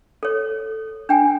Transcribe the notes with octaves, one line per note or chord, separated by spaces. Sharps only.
A4 C#5
D4 G5 G#5